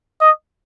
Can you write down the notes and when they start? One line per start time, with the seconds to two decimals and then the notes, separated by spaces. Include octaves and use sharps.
0.20 D#5